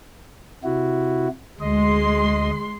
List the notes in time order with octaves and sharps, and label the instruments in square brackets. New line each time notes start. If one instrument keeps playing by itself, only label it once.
[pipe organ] C3 E4 F#4
[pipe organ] D2 D#5 [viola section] G#3 C6